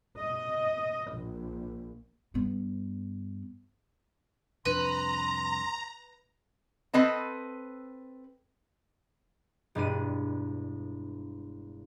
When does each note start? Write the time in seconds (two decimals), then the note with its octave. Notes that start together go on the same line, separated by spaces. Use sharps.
0.18 D#5
1.12 A#1
2.34 G2 B3
4.65 C2 F2 D4 B4 A#5 C6
6.94 C4 A4 B4 D#5 A5
9.75 E1 G2 D4 D#7